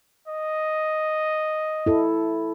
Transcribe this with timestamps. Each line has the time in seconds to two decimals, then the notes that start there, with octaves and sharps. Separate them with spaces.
0.28 D#5
1.86 E4 A4